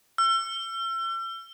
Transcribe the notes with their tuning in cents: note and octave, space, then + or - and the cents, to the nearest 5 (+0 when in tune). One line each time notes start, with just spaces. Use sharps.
E6 +40